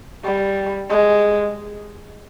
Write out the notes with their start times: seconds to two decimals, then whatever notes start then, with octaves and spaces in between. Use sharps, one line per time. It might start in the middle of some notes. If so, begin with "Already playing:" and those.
0.24 G3
0.90 G#3